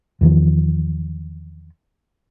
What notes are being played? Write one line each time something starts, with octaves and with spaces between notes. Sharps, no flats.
E2 D#3 F3